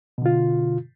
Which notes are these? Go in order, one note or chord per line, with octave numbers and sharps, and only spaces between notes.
B2 D3 F4